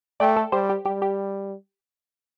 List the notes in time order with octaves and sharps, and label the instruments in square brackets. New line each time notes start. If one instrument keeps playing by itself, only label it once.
[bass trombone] A3 [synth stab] D5 G5
[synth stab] A4
[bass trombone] G3 [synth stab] G4 C5
[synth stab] G4
[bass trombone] G3 [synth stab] G4
[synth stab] G4